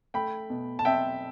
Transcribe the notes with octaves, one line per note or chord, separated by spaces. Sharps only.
A3 G5 B5
B2
A5
C4 E5 G5